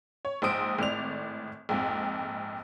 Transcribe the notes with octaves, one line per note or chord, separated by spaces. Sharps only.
C#5
A#1 G#2 C5 D#6 D7
G#1 A2 D5 F7
A#1 F2 G#2